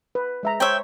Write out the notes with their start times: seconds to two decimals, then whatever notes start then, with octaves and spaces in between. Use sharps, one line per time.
0.15 B4
0.43 G#3 E5 A#5
0.60 C5 C#5 E5 G5